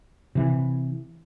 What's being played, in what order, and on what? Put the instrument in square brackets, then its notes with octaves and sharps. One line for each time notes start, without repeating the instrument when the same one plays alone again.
[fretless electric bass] C3 E3